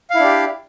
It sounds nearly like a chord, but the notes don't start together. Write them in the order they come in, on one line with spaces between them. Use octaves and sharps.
F5 E4 D4 G4